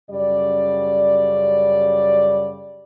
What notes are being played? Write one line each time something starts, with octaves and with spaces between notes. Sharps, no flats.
F#2 C#3 G3 D5